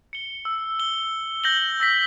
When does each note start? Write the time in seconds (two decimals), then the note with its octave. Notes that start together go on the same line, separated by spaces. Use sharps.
0.13 C#7 G7
0.45 E6
0.80 G7
1.44 G6 A#6 F#7 G7
1.80 E6 A#6 B6